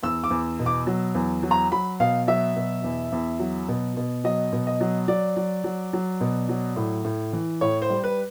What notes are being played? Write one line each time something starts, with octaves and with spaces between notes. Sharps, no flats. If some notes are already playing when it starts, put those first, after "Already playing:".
E2 E6
D6
E2
B2
D6
F#3
E2
F#3
A#5
F#3 B5
B2 F5
F#3 E5
B2
E2
E2
F#3
B2
B2
F#3 D#5
B2
D#5
F#3
F#3 D5
F#3
F#3
F#3
B2
F#3
A2
A2
E3
A2 C#5
C5
G3
B4